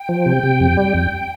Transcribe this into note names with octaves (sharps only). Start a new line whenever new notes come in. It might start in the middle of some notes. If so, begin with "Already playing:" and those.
Already playing: G5
F3
C3
C3
F2
G3
F2